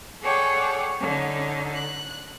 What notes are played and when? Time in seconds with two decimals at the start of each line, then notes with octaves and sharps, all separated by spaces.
0.22 G#4 A4 C#5 D5 F#5 G5
1.01 D3 C#4 D#4
1.74 F#6